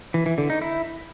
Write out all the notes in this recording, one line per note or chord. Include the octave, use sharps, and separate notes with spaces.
E3
E3
D3
D#4
E4